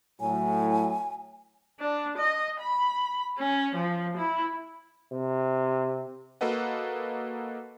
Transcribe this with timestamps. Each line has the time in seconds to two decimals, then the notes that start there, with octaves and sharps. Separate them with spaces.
0.20 A2 F#3 G#5
1.80 D4
2.18 D#5
2.60 B5
3.39 C#4
3.76 F3
4.18 E4
5.13 C3
6.41 A#3 F#4 A4 B4 D#5 F#5